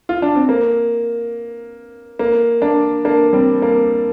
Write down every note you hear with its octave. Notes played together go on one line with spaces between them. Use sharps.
F4
D4
C4
A#3
A#3
A#3 D4
A#3 D4
G3 C4
A#3